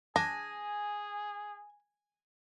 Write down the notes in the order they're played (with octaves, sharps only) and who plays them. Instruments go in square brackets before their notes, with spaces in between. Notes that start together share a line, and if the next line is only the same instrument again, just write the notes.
[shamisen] D4 [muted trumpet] G#4 [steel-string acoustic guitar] G#5 [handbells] A#6